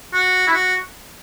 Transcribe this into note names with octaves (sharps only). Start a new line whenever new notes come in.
F#4
E4
F#4